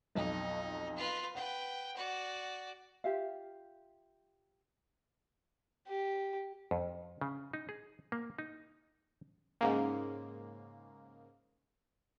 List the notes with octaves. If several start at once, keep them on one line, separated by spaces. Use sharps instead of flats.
B1 F2 D#4
F4 B4
B4 F#5 G5
F#4 D5
F4 G4 E5 F5
G4
F2
C#3
D#4
G#4
A#3
D#4
G#2 C#3 A#3